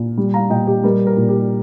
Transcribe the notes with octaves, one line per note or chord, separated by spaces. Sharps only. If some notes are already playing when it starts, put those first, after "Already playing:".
Already playing: A#2
G3
F5 A#5
A#2 D#5 G5
G4
G3 A#4
A#4
A#2
G4